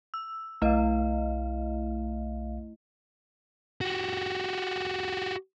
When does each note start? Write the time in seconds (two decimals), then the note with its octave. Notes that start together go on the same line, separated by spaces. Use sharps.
0.14 E6
0.62 B1 A3 E4 D#5 F5
3.81 F#4 G4